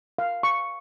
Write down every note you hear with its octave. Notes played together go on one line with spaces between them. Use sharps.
F5
C#6